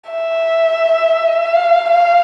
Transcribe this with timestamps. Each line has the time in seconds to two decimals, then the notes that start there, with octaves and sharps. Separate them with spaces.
0.10 E5
1.45 F5
1.89 F5